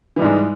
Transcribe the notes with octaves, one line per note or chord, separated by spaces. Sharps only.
G#2 E3 G3 G#3